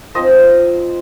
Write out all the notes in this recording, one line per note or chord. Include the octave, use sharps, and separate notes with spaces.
F3 C4 D#4 C5 D#5